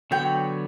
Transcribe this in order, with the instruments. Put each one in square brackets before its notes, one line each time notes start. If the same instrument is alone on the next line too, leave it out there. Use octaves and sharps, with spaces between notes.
[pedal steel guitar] D3 F#3 B3 F#4 C#5 [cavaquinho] G5